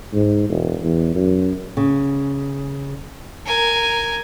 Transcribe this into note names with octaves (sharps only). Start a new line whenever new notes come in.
G#2
E1
E2
F#2
C#3
A#4 G#5